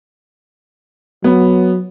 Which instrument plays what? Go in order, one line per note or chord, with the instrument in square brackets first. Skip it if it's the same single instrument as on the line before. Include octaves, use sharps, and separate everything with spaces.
[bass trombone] F#3 [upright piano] B3